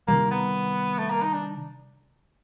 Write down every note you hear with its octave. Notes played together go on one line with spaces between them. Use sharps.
C3 D#3 G3 A#3
B3
A3
A#3
D#4
D4